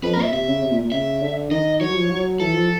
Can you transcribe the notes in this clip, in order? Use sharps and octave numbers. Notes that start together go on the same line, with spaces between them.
F2 B4
A#4
A#2 E5
C3 E5
C#3
C3
A#2
A#2
C#3 E5
D3
D#3 D#5
F#3 C#5
F3
F#3
E3 A4
F3